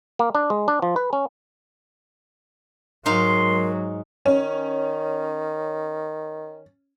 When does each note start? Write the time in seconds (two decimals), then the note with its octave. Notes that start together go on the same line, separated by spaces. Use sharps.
0.19 A#3
0.35 D4
0.50 G#3
0.68 D4
0.82 F3
0.96 B4
1.13 C#4
3.06 G#2 F#3 D#4 A#4 F5 C6
4.26 D#3 C#4